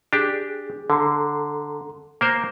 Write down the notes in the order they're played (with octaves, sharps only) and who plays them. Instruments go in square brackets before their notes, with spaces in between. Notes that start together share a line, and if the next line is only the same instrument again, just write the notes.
[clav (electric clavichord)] D4 G4 [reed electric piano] G#4
[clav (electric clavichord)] D3 [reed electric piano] A4 A#5 C6
[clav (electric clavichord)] A#3 A#4 C5